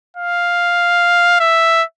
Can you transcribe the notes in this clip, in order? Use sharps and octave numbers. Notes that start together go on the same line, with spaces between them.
F5
E5